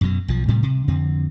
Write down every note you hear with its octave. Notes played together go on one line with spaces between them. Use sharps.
F#2 B2 F#3
B1 F3
A2 C3 G3 A3
C3
F2 D3 C4